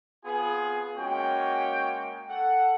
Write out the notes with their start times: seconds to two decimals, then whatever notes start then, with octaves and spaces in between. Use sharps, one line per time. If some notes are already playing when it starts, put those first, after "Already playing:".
0.25 B3 C4 F4 G#4
0.95 G#3 A#3 C#4 F#4 G5
2.29 A4 F#5